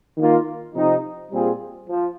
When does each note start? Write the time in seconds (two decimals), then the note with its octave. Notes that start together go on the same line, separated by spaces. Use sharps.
0.17 D#3 A#3 F4
0.75 C3 F3 C4 D#4
1.32 A#2 G3 C4 F4 G#4
1.88 F3